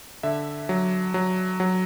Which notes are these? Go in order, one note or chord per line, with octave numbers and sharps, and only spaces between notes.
D3 E5
F#3
F#3
F#3